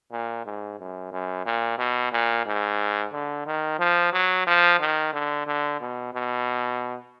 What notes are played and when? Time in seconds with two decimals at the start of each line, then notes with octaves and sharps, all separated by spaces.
0.12 A#2
0.46 G#2
0.79 F#2
1.12 F#2
1.46 A#2
1.78 B2
2.12 A#2
2.46 G#2
3.12 D3
3.46 D#3
3.79 F3
4.13 F#3
4.47 F3
4.80 D#3
5.13 D3
5.47 D3
5.81 B2
6.14 B2